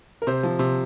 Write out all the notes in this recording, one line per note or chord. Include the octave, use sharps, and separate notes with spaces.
A#4
C3 C5
F3
C3